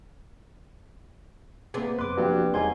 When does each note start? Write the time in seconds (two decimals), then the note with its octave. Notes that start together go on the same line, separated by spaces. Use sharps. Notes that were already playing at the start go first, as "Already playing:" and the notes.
1.74 C3 A#3 B3 G#4 D5
1.99 F#2 B4 C6 D6 F#6
2.17 G2 F3 A#3 F#4
2.54 E2 G#2 G3 C#5 G#5 C6 G#6